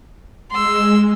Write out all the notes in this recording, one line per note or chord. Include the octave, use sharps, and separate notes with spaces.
G#3 C6 E6